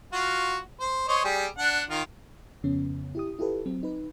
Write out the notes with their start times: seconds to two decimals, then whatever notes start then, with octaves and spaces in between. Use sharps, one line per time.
0.13 F4 F#4
0.80 C5
1.08 C5 C#5 D#5
1.24 G3 G4 G#4
1.59 D4 F#5
1.90 D#3 F4
2.64 F2 C#3 B3 C#4
3.15 E4 G4 D#6
3.39 E4 F4 G4 A4 B4
3.66 F#3 C4
3.83 D#4 B4